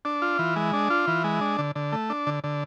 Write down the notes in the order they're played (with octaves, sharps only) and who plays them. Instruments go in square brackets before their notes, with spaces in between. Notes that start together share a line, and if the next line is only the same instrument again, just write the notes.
[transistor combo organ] D4
F4
E3
G#3
D4
F4
E3
G#3
D4
D3
D3
A3
D4
D3
D3